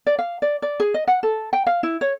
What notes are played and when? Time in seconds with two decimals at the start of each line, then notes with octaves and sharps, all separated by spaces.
0.07 D5
0.19 F5
0.42 D5
0.62 D5
0.80 G#4
0.94 D#5
1.08 F#5
1.23 A4
1.53 G5
1.67 F5
1.83 E4
2.01 C#5